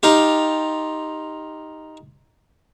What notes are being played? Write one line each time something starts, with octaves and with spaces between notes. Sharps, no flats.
D#4 F4 G4